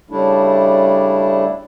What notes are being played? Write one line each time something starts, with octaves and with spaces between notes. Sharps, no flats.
C#3 G3 A3 D4 E4